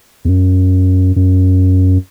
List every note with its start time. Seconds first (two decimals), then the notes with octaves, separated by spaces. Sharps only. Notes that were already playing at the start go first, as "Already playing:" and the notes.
0.25 E2
0.29 F#2
1.16 F#2